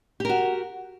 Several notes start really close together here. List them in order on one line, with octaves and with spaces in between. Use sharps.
G4 A#4 F#4